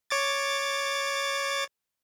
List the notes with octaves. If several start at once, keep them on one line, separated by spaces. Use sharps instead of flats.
C#5 D6 A6